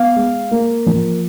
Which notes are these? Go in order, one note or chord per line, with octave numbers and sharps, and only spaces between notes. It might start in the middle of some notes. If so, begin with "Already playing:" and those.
Already playing: B3 F5
G#3
A#3
F3